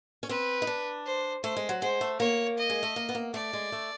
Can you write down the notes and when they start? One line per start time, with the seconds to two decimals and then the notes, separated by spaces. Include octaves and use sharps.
0.23 C#4
0.29 C4 B4
0.62 D#4
0.67 D4
1.06 C5
1.44 A3 C5
1.57 G#3
1.69 F#3
1.81 G#3 C5
2.01 A3
2.20 A#3 C#5
2.58 D#5
2.70 G#3
2.83 A3
2.96 A#3
3.09 B3
3.15 A#3
3.34 A3 D5
3.53 G#3
3.72 A3